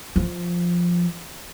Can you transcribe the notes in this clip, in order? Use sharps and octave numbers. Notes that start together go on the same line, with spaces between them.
F3